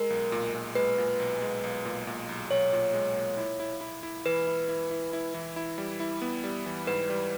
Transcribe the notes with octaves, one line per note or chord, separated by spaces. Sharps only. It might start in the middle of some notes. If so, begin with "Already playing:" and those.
Already playing: G#3 A#4
B1
A#2
A#2
G#3 B4
A#2
B1
G#3
B1
A#2
A#2
B1
B1 C#5
A#2
G#3
A#2
E4
E4
E4
E4
E3 B4
E4
E4
E4
E4
E3
E4
G3
E4
B3
G3
E3
G#2 B4
G3